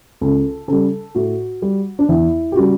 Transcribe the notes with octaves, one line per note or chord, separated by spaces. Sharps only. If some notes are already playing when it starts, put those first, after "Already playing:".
C#2 A4
C#3 G3 A4
A2 F#4
G3
D4
E2 E4
G4
C#3 G3 F#4